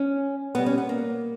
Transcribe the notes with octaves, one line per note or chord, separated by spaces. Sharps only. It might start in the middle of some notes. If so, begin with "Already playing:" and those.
Already playing: C#4
B2 G3 B3
C#4
B3
A#3